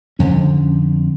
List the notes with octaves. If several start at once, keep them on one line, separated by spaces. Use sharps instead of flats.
F2 D3 C#4